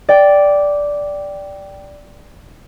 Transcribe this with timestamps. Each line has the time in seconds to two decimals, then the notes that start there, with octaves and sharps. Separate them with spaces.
0.09 D5 G5